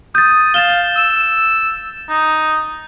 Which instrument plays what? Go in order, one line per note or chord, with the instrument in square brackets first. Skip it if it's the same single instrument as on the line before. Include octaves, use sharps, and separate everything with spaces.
[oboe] D#6 [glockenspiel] G6 A6
[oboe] F5 [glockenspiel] A6 E7 G7
[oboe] E6
D#4